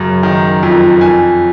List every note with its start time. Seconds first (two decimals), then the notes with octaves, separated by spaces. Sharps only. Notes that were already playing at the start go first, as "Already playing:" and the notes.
Already playing: F#2 C#3
0.23 D#3
0.63 F2
1.01 F2 G#5